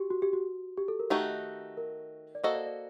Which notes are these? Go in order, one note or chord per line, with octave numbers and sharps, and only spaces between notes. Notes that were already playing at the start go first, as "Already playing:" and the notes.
Already playing: F#4 G4
F#4
G4
F#4
G4
A4
A#4
D#3 A3 D#4 F#4 G4
A#4
D5
A#3 F#4 A4 C5 D#5
D5
D5